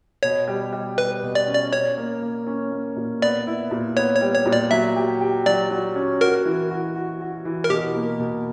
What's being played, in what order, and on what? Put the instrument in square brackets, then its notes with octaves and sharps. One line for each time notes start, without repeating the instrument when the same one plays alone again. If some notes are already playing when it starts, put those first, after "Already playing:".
[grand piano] B2 [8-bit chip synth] C#5
[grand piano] G3
G3
[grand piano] G3 [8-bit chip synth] B4
[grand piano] B2
[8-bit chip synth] D5
[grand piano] C#4
[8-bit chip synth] D5
[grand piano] C#4 [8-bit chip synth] C#5
[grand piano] A#3
A#3
C#4
A#3
A#2
[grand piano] B3 [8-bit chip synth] D5
[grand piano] E4
A#2
[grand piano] B3 [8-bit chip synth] C#5
[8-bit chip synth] C#5
[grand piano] G3
[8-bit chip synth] C#5
[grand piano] A#2
[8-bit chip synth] D5
[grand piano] F#3 [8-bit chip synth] E5
[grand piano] G4
G4
[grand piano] F#3 [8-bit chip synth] D5
[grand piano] F#3
C#4
[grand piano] F#4 [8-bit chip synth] A#4
[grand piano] E3
F#4
F#4
F#4
E3
[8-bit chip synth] A#4
[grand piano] B2 [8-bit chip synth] G4
[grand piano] A#3
B2